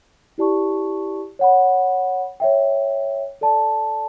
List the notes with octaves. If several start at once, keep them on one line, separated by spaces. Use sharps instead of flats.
E4 G4 D5 A5 C#6
C#5 F#5 B5
C#5 E5 G5
A4 D5 A5